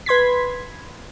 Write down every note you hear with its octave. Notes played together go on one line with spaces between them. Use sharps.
B4 C6 G#6 B6